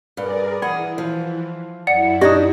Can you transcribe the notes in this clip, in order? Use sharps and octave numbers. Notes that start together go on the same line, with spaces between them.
G2 G#4 A#4 D5
E3 G#4 D5 F#5 B5
F3
F#2 E4 D5 F#5 C#7
D4 D#4 G4 D5 D#5 D#6